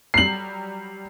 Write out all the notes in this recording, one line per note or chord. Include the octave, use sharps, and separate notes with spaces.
F#3 G3 C7 F#7